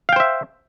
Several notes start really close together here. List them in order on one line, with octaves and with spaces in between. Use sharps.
F5 G5 C5 E5